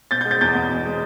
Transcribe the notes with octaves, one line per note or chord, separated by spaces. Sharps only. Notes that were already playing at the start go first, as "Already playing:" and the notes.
B2 G6 A6
G6 A6
G#3
G6 A6
E2 G6 A6
E2
B2
G#3